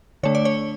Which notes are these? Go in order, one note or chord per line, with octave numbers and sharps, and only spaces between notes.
D3 A3 D4 C#5
D5
C#5